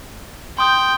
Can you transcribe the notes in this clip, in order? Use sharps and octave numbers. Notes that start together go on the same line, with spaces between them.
G5 C6 D#6 G6